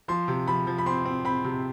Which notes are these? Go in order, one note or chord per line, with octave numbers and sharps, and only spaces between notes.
F3 C6
C3
F3 B5
F3
B5
C4 C6
C4
C4 B5
C3